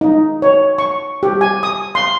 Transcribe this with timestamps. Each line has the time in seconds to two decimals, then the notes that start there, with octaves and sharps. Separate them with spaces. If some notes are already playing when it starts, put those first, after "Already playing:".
0.01 D#4
0.42 C#5
0.78 C#6
1.23 G4
1.41 G#5
1.63 D#6
1.95 C6